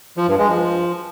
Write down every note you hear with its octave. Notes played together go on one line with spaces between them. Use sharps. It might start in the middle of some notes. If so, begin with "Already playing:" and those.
F3
G2
G#3
F3